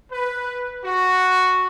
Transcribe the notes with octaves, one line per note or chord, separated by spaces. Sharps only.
B4
F#4